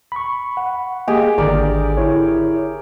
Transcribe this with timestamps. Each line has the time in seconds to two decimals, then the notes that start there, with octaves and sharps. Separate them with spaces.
0.12 B5 C#6
0.57 F#5
1.08 A#3 G4 G#4 D#5
1.38 G#1 D3 A#4 D5
1.97 E4 C#5